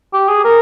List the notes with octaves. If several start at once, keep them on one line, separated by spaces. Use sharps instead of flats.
G4
G#4
A#4